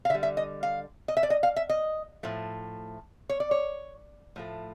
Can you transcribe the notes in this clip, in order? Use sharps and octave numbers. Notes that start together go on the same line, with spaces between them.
F5
D3 G3 E5
E5
D#5
F5
D#5
E5
D5
D#5
F5
E5
D#5
A2 F3 A3
C#5
D5
C#5
A2 F3 A3